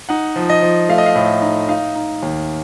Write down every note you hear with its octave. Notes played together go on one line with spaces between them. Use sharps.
D#4 F#5
F3
D#5
F3
A3 F5
D#5
F5
A2
D#4
D#4 F5
D#4
D#2